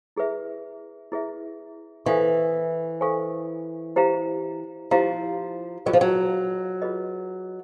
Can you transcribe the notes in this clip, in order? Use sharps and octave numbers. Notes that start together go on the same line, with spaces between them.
E4 G#4 B4 E5
E4 G#4 B4 E5
E3 A4 C5 F5 G#5 C#6
A4 C5 F5 G#5 C#6
E4 G4 C5 F5 A#5
F3 E4 G4 C5 F5 A#5
F#3 F4 G#4 B4 D#5
F3
F#3
F4 G#4 B4 D#5